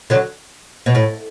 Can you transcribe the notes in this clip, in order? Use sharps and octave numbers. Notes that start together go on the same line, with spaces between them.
D3 F#3
B2
A2